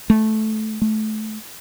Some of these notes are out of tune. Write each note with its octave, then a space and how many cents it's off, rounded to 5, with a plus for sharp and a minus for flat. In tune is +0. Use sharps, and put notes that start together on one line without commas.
A3 -15
A3 -20